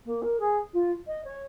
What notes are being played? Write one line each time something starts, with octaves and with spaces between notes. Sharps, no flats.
A#3
A#4
G#4
F4
D#5
C#5